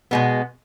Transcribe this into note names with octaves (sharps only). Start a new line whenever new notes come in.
B2 G#3 B3